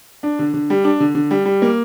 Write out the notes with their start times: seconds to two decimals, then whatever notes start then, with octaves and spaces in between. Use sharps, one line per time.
0.23 D4
0.39 D3
0.54 D3
0.70 G3
0.84 D4
1.00 D3
1.15 D3
1.31 G3
1.45 G3
1.62 A#3